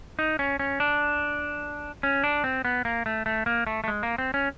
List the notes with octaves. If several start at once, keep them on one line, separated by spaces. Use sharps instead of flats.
D#4
C#4
C#4
D4
C#4
D4
C4
B3
A#3
A3
A3
A#3
A3
A3
G#3
A#3
C4
C#4